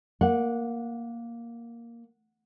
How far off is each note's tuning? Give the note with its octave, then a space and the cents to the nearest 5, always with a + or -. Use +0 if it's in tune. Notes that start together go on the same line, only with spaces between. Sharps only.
A#3 +0 F#5 -15